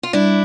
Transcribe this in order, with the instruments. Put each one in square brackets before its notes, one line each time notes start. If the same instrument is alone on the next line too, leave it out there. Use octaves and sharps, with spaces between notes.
[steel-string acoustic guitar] F4
[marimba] G3 [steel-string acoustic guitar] D4 E4